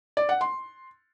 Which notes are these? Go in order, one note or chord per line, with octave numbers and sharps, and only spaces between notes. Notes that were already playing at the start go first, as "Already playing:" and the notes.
D5
F#5
C6